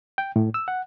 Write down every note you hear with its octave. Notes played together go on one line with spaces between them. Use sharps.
G5
A2
E6
F#5